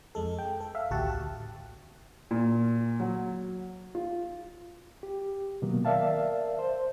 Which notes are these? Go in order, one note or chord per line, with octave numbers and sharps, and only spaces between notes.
F2 G#3 A4
G5
A4
E5 F5
A1 D2 F#4 G4 F#5 A5
A#2
F#3
F4
G4
B2 D#3 F#3 A#3 B3
A#4 D5 E5 F5 A5
C5